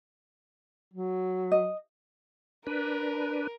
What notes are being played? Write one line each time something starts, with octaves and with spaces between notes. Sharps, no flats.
F#3
D#5
D4 A#4 B4